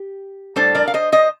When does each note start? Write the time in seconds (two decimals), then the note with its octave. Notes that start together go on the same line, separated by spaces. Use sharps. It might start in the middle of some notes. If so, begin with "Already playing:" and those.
Already playing: G4
0.56 A2 G3 D4 A4 C5
0.75 A#4 D5
0.88 F5
0.94 C5 D#5
1.12 C5 D#5